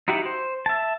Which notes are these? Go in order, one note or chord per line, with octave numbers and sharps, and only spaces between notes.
D#4 E4 F#4 G4 F#5
C5
E5 A5